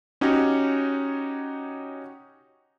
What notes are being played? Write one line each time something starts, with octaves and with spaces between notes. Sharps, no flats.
C#4 D#4 F#4 G4 C#5